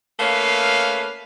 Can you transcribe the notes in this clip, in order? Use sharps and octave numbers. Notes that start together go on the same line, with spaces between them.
A3 A#3 C#4 B4 F5